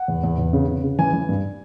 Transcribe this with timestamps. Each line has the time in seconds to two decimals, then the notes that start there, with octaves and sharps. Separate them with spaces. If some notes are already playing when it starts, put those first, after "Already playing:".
Already playing: F#5
0.08 E2
0.24 E2
0.39 E2
0.53 C#3
0.68 C#3
0.84 C#3
0.99 E3 G#5
1.13 E3
1.29 G2